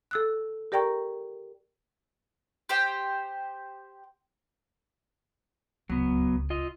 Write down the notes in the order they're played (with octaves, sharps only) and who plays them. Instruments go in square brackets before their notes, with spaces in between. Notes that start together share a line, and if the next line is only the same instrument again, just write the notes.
[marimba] A4 E6 F#6
G4 A#4 D5 G5 A#5 C#6
[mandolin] G4 C5 G5
[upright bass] D1 C#2 [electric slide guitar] F#3 B3
[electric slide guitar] F4 D#5